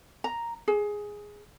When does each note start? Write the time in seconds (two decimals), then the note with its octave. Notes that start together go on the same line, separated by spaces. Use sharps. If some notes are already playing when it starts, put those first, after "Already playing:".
0.24 A#5
0.68 G#4